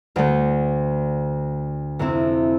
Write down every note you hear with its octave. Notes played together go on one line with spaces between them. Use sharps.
D2 D3 A3
F2 C3 F3 C4 E4